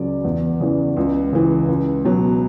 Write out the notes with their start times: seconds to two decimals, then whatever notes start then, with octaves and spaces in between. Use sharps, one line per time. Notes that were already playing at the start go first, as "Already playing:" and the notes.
Already playing: C#2 C#3 F#3 D5
0.24 E2
0.60 C#3 E3
0.97 C#2
1.32 C#3 E3
1.68 C#2
2.05 B2 F#3